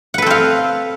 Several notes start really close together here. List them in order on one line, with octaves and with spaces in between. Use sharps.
F#5 B4 A4 C4 F5